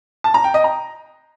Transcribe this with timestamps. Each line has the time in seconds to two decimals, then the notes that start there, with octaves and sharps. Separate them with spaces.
0.24 A5
0.34 A#5
0.44 G5
0.54 D#5
0.64 A#5